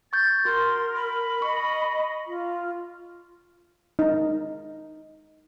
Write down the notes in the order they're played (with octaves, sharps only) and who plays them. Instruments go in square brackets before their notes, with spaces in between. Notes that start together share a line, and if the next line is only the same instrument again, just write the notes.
[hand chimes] C#6 G6 [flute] A6
[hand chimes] F#4 [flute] A#4 [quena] C6
[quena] B5
[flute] D#5 [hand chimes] C#6
[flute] F4
[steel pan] D#4 A#5